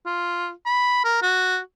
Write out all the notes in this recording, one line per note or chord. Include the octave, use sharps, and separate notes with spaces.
F4
B5
A#4
F#4